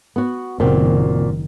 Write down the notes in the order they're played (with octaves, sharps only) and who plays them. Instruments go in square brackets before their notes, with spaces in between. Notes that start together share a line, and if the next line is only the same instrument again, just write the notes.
[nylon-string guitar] B3 F#4
[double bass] F#1 D#3 [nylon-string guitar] A#2 C4 F#4